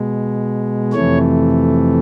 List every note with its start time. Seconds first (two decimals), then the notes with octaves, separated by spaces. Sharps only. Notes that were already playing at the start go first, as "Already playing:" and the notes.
Already playing: B2 G#3
0.93 F2 C3 E3 A3 C#5